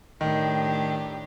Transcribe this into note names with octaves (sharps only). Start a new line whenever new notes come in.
A2 D#3 D4 G4